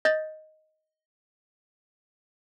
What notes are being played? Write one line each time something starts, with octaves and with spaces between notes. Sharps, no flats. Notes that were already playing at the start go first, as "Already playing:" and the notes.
D#5 G6 A6